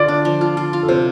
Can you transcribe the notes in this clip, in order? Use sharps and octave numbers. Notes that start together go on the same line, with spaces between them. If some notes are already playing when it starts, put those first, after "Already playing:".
Already playing: D3 F4 D5
D4
F3
F4
F4
F4
A4
C3 C5